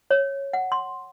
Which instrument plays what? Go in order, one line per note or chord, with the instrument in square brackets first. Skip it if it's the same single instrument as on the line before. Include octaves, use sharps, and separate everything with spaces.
[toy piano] C#5
F#5
C6